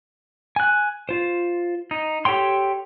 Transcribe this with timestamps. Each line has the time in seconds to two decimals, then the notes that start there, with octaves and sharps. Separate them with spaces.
0.56 G#5 F#6
1.09 F4 C5
1.91 D#4
2.25 G4 A4 C#5 G5 C6